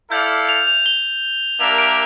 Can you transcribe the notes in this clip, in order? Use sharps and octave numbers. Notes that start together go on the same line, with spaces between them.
E4 A4 D5 F5 G6
F7
F7
G7
A#3 D4 G4 A#4 E5 F7
D7